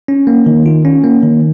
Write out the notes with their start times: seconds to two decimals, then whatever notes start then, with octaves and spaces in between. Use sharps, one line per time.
0.08 C#4
0.27 A#3
0.46 D#3
0.66 F4
0.85 C#4
1.04 A#3
1.23 D#3